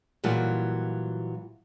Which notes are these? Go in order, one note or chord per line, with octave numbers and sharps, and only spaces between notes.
A#2 E3 F#3 G3 F4